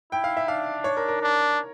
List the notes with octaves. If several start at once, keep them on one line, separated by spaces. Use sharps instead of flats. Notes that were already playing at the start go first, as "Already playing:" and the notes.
E4 G5
F5
E5
D4 F5
C#5
A#4
A#4
D4